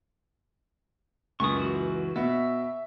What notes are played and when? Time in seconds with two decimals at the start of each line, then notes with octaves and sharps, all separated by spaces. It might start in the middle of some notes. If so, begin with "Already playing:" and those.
1.40 C#2 F#2 C#6 D#6
1.56 E3 F#4
2.16 B2 E5